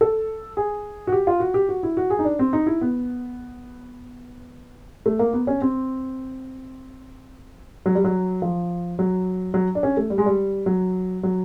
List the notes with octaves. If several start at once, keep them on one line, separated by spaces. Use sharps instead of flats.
A4
G#4
F#4
G4
F4
F#4
G4
F#4
E4
F#4
G#4
D#4
D4
C4
D#4
E4
B3
A3
A#3
B3
C#4
C4
F#3
G3
F#3
F3
F#3
F#3
D4
C#4
A3
G3
G#3
G3
F#3
F#3